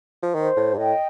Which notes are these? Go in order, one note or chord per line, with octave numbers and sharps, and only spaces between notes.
F3
D#3 C5
A2
G2
A2 D#5 G5